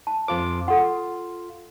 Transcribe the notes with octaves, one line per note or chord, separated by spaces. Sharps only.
A5
F2 F4 C5 D6
F4 A4 F#5